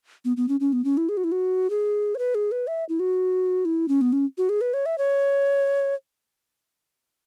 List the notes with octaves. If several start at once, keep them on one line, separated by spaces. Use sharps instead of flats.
B3
B3
C#4
C#4
B3
C#4
E4
G#4
F#4
E4
F#4
G#4
C#5
B4
G#4
B4
E5
E4
F#4
E4
C#4
B3
C#4
F#4
G#4
B4
C#5
E5
C#5